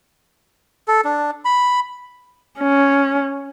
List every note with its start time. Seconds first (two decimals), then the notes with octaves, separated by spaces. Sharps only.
0.88 A4
1.05 D4
1.45 B5
2.59 C#4